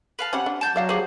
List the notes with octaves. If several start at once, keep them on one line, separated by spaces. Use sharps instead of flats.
B4 F5 A5
G3 C4 C#4 F#5
D4
A5 G6
F#3 D5 F5 F#5
G4 G#4 C5